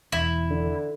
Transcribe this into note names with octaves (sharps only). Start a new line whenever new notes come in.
E1 E2 E4
D3